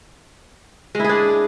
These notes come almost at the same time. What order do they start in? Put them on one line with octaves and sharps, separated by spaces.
G#3 E4 G#4 D4